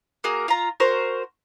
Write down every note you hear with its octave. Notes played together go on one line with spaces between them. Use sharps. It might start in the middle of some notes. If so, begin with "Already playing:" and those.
A#3 F#4 G#4 A#4
F4 A#5
F#4 A#4 C5 C#6